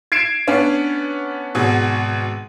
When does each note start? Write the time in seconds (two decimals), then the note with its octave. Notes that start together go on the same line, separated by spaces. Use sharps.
0.12 G#6 C7 D7 E7
0.47 B3 C#4 D4
1.55 G#1 B2 F#4 G#4